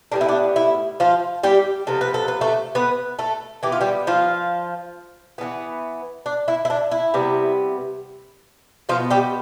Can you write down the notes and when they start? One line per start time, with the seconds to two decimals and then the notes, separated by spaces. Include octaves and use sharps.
0.12 A2 G3 B3 D4
0.21 E4
0.28 D4
0.56 E4
1.00 F3 F4
1.43 G3 G4
1.87 C3 F3 B3 A4
2.01 B4
2.14 A4
2.28 B4
2.41 A3 A4
2.75 B3 B4
3.19 A3 A4
3.63 E3 B3 G4
3.72 F4
3.81 G3 G4
4.07 F3 F4
5.38 E3 G3 B3
6.26 D4
6.48 E4
6.65 E4
6.70 D4
6.91 E4
7.14 C3 G3 B3
8.89 B2 F3 B3 F4
9.11 G3 G4